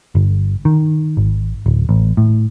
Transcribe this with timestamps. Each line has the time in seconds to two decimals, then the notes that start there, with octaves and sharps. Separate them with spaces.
0.15 G1
0.65 D#3
1.17 G#1
1.66 D1
1.89 A1
2.17 A2